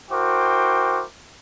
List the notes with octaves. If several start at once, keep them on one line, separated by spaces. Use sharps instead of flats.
E4 F#4 A#4 C5 G5 D6